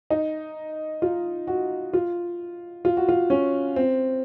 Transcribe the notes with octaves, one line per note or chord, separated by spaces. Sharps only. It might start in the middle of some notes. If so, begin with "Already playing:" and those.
D#4
F4
F#4
F4
F4
F#4
F4
C#4
C4